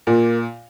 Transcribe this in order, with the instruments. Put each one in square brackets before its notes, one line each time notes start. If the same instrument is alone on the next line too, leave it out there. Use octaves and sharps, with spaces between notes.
[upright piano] A#2 [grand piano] A#3